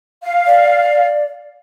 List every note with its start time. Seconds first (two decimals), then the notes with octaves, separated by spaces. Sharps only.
0.23 F5
0.47 D5